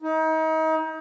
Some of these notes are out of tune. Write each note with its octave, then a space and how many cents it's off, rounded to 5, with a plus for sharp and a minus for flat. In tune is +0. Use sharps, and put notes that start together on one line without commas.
D#4 +35